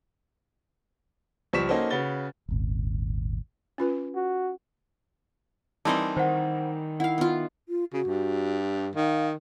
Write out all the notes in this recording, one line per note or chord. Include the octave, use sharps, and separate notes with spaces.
C#2 F3 G3 C#6 B6 E7
A#3 C#4 D#4 F#4 A4 C5
C#3 F#4 B4 A6 G7
D#1 G#1
C#4 F4 B4
F#4
E3 G3 C4 D#4 A#4 D#5 A5
D#3 C5 F#5
E4 F5 F#5
B3 F4
F4
C#3 F#4
G2
D#3 F5